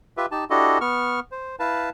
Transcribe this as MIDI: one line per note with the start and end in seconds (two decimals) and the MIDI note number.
0.17 0.26 65
0.17 0.26 67
0.17 0.26 71
0.17 0.26 76
0.31 0.45 63
0.31 0.45 67
0.31 0.45 81
0.50 0.78 62
0.50 0.78 64
0.50 0.78 66
0.50 0.78 67
0.50 0.78 69
0.50 0.78 75
0.81 1.20 59
0.81 1.20 85
0.81 1.20 89
1.32 1.56 72
1.60 1.90 64
1.60 1.90 71
1.60 1.90 77
1.60 1.90 81